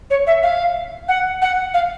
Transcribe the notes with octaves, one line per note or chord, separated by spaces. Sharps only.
C#5
E5
F5
F#5
F#5
F5